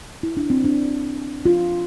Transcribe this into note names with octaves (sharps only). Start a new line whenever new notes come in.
E4
D4
C4
D4
F4